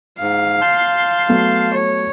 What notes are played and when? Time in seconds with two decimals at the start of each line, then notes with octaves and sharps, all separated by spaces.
0.20 G#2 F5
0.61 A5 C6 G6
1.29 F#3 A3 B3
1.73 C#5